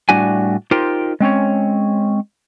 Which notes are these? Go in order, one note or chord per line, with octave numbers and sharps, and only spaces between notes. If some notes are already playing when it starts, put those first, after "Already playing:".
A2 G3 D4 F#4 G#5
D#4 F4 G4 A#4 C5
G#3 C4 C#4 C#5